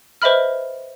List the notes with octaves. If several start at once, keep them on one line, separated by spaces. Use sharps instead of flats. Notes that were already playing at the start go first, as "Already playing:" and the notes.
B4 C5 D#5 E5 B5 F6